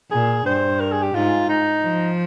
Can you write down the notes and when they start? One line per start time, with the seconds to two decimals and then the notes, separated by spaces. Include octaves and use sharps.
0.11 A#2 G#4
0.46 G2 C5
0.80 A#4
0.92 G#4
1.03 G4
1.15 G#2 F4
1.49 D#4
1.83 F3